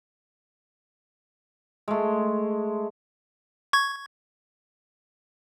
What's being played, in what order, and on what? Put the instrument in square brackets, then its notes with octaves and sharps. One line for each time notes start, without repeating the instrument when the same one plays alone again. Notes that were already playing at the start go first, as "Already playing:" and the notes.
[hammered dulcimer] G#3 A3
[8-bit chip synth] C#6 G#6